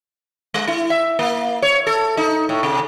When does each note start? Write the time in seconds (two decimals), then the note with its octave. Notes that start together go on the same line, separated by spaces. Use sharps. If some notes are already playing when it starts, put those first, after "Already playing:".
0.54 G#3
0.68 E4
0.90 E5
1.19 A#3
1.62 C#5
1.87 A4
2.17 D#4
2.49 A2
2.63 C3